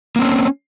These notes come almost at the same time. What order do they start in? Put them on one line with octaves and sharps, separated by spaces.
A#3 C4 C#4